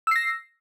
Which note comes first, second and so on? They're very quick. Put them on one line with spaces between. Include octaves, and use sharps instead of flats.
E6 C7 A#6